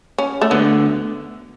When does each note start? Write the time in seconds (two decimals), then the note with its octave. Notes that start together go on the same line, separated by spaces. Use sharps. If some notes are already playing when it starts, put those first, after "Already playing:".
0.18 C#4
0.42 A3
0.51 D2 D3 B3